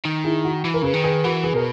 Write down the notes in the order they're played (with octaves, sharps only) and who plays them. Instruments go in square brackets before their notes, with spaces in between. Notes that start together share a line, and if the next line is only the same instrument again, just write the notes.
[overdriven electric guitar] D#3
[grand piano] E4 G#4
F#4
[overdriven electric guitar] E3
[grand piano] A#4
[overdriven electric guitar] C#3 [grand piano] G#4 B4
[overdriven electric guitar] D#3
[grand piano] G#4 B4
[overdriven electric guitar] E3 [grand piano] F#4 A#4
[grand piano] G#4 B4
[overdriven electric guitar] B2 [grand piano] A#4